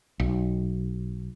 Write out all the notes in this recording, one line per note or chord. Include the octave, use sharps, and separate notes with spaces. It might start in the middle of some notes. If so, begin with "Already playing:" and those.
B1